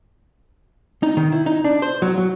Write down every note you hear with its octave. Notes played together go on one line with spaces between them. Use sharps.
D#4
D#3
E4
D#4
D4
C5
F#3
F#3